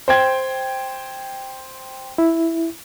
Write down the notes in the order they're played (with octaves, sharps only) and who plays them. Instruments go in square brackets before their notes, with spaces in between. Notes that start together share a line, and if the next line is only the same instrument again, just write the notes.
[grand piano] C5 G5 G#6
[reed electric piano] E4